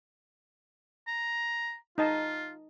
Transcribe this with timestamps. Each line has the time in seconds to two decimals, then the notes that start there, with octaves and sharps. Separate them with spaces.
1.08 A#5
1.98 D#4 F4 D#5 A5